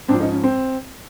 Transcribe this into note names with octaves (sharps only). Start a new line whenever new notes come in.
G#2 F3 C4 D4
C#4 D#4
C#4
C4